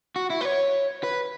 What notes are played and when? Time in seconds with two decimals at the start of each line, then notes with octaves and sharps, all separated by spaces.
0.16 F#4
0.30 E4
0.41 B4
0.45 C#5
1.03 B4